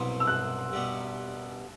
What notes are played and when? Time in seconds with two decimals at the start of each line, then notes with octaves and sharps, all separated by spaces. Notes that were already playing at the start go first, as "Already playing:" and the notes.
Already playing: C2 B2 F#3 B3 C6
0.20 E6
0.27 F#6
0.73 B2 G3 B3